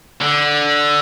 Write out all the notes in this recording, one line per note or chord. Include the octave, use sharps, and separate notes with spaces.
D3